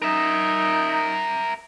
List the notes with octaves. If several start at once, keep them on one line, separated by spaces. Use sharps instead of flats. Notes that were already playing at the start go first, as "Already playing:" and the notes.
D#4 A#4 E5